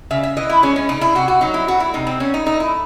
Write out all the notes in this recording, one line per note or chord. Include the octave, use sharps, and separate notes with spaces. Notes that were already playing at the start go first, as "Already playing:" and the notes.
C#3 E5
E5
E3 D#5
E4
G#3 C#4
C#4
C#3 D#4
E4
C3 F#4
F#4
F#3 D#4
E4
A3 F#4
E4
C3 D#4
C4
A3 C#4
D#4
A3 D#4
E4